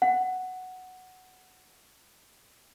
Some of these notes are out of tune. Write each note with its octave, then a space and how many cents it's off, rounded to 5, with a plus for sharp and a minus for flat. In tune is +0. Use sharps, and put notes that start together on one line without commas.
F#5 +0